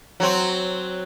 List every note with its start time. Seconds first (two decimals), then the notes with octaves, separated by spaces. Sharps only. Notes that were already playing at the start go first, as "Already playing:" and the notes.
0.20 F#3 C4